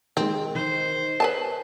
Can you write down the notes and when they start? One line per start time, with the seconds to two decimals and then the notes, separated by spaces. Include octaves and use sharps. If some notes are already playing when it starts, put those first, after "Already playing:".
0.17 D#3 G#3 C4
0.55 D#3 C5
1.20 A#4 B4 C#5 G#5 A5